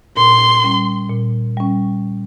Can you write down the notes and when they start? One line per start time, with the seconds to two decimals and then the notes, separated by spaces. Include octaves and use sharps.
0.17 A#2 C6
0.64 G3 C#4
1.10 A#2
1.57 G3 C#4